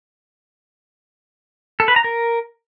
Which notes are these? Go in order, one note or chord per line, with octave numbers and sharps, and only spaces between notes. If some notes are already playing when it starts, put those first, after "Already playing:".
A4
B4
A#5
A#4